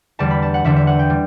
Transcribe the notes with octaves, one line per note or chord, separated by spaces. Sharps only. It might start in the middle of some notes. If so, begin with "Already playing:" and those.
E2 D3 G3 A5
B5
A5
F#5
E2 D3 G3 E5
E5
F#5
G5
G3